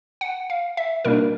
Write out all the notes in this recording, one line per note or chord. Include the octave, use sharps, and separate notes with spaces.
F#5
F5
E5
B2 G3 A#3 D4 A#4